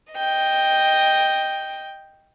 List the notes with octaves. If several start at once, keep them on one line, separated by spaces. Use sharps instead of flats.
D#5 G5